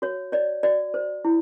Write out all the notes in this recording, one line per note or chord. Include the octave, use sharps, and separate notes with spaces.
F#4 C#5
C#5 D5
F#4 D5
C5
E4